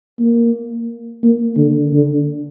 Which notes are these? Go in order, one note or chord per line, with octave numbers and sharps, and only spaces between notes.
A#3
A#3
D3
D3